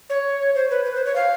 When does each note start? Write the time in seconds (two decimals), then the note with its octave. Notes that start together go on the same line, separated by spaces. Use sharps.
0.10 C#5
0.55 C5
0.70 B4
0.85 B4
0.95 C5
1.05 C#5
1.16 F5